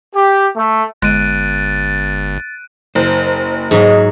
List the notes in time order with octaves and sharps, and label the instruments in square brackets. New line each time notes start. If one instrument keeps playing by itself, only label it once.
[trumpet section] G4
A3
[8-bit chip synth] G1 [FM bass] G#3 [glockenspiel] F#6 D7 D#7 [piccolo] A6
[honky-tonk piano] F#1 [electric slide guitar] C5
[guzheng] G#2 F#3 [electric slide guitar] G#4 [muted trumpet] D#5